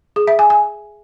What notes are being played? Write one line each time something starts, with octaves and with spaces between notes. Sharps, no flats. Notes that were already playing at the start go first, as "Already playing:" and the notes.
G#4
E5
G#5
G#5